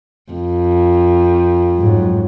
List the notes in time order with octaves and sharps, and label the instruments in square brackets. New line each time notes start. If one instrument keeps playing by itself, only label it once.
[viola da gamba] F2
[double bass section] G#2 F#3